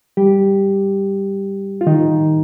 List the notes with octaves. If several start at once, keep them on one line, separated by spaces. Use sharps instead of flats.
G3 G4
F4
D#3 D#4